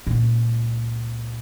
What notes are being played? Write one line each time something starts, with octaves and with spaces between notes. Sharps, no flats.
C#2 A#2